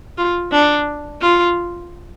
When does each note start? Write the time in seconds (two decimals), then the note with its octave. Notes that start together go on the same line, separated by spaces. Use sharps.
0.18 F4
0.52 D4
1.21 F4